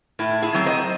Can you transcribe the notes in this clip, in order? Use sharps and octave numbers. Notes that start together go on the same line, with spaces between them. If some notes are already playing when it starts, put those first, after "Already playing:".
A2 E4
E4 G#4
F#3 C4
C5 D#5